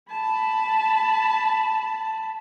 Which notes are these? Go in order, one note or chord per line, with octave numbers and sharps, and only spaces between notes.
A5 B5